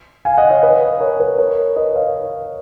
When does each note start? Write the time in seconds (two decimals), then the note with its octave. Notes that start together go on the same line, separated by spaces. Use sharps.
0.25 F5 G#5
0.38 D#5 F#5
0.50 C#5 F5
0.63 B4 D#5
1.00 A#4 C#5
1.20 B4
1.38 A#4 C#5
1.76 B4 D#5
1.96 C#5 F5